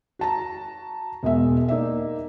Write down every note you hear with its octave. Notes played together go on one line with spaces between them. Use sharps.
F#4 A5 A#5
E1 B2 G#3 E5
A#3 D#4 D5 E5